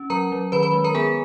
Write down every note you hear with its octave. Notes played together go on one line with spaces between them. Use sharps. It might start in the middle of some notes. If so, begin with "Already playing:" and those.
Already playing: C#4
F#3 A#4 A#5
F#3
D#3 B4 B5
B4 B5
G#3
A#4 A#5
B3 G#4 G#5